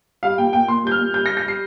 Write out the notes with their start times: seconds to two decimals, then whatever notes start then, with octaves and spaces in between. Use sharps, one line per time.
0.23 G3 F5
0.38 A#2 G5
0.53 A#2 G5
0.68 A#2 C6
0.84 G3 G6
0.92 F6
0.98 A#2
1.14 G3 G6
1.26 A#6
1.29 G3
1.37 A#6
1.45 G3 C7